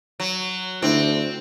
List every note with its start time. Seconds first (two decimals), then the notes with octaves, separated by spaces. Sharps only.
0.20 F#3
0.82 D2 C4 D4 E4